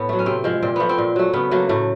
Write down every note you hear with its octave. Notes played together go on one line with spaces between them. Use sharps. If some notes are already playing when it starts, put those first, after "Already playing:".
Already playing: A2 B3
F#3 A3
C#4
C3 C4
F3 G#3
A#2 C4
F3 A3 B3
C4
A#2
F#3 A3
C#3 B3
F#3 A3 A#3
A2 A3